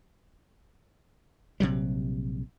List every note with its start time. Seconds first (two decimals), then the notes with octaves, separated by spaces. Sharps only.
1.60 A#1 C3 F#3 G3